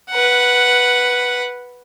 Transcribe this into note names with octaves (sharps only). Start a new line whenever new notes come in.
B4 F#5